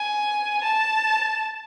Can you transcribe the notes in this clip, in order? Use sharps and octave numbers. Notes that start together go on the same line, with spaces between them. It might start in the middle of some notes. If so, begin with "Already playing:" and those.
Already playing: G#5
A5